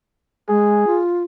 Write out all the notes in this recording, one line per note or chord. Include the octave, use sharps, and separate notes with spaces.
G#3 G#4
F4